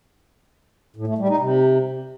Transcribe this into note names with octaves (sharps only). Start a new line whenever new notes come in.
A2
A3
G3
D#4
C3